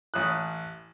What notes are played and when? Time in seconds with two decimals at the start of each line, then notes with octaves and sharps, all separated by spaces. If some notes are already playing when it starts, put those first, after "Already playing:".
0.14 A1 D#6 F#6